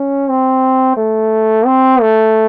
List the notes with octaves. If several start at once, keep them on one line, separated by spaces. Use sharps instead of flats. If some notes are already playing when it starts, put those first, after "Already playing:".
Already playing: C#4
C4
A3
C4
A3